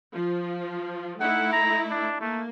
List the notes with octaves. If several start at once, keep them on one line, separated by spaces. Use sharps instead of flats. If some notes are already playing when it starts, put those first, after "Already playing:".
F3
A3 D#4 E4 F#5
A#5
D4
A3 A#3